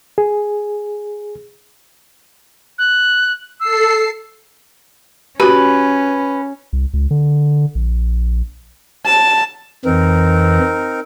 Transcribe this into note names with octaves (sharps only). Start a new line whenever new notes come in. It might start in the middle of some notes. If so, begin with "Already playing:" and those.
G#4
F#6
A4 E6 C7
C#4 F#4 G4 B4
C2
C#2
D3
A#1
A5
F2 E3 C4 D#4 A#4